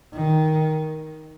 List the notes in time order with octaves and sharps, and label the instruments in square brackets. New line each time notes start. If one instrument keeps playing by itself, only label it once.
[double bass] D#3